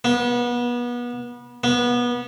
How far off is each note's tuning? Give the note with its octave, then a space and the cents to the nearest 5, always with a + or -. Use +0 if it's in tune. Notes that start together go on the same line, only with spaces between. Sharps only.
B3 -30
B3 -25